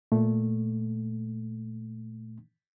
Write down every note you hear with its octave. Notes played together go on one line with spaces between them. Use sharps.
A#2 A3